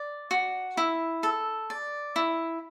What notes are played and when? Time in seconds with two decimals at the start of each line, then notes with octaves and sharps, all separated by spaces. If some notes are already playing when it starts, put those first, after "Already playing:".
Already playing: D5
0.31 F#4
0.77 E4
1.23 A4
1.70 D5
2.16 E4